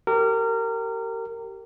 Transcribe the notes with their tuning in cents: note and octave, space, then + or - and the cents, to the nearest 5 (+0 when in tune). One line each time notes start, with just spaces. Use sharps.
G4 -15 A#4 -25